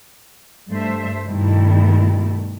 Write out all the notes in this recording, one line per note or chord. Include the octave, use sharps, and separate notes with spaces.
G2 A3 C5 E5
G2 B2 D#3 G3 A3 E4